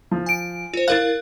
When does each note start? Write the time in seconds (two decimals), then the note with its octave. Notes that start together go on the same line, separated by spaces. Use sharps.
0.11 F3
0.26 G#5 D7
0.74 F4 C5
0.88 E4 A#4 F5 F#6 A6